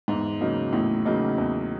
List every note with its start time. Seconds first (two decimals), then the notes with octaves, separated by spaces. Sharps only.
0.08 E2 G#2
0.41 C#3 F#3 A#3 D#4
0.72 E2 A2
1.05 C#3 F#3 A#3 D#4
1.38 E2